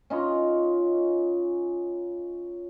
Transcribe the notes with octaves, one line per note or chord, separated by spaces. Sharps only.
C#4 D#4 F4